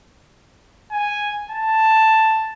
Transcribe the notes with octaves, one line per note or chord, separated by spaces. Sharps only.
G#5
A5